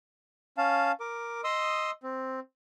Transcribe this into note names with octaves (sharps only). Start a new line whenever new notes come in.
C#4 F5 A5
A#4 D6
D#5 C6 D#6 E6
C4